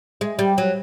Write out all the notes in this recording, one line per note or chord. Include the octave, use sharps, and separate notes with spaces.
G#3
G3
F#3